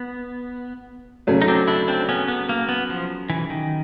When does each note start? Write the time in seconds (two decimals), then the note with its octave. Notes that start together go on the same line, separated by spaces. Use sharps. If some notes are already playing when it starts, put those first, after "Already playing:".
Already playing: B3
1.27 C#3 F#3 A3
1.42 D#4
1.48 C4 D4
1.67 D4 E4
1.88 C4 D4
2.09 B3 C#4
2.28 B3
2.49 A#3
2.69 B3
2.90 F3
3.30 E3
3.50 D#3